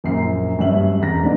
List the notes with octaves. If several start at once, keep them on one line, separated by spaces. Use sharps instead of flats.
A#1 F#2 F#4 A#5 C7
G2 F#3 C#4 E5 F#7
E1 F2 A#5 A#6
G#2 G3 A#3 B3 D4 D#4